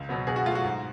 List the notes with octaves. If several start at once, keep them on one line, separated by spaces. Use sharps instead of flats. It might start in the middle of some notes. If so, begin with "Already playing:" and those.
Already playing: C#2
B2 F#3 B3
B2 G#4
F#4
F#3 A3 F4
F#4
G#2